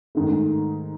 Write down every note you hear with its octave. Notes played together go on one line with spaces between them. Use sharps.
G#2 D#3 A3